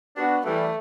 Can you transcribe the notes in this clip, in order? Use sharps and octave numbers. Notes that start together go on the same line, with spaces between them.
B3 D4 F#4
E3 G3 A3